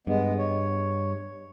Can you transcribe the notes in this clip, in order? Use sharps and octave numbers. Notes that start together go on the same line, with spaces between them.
G2 G#3 B3
C#5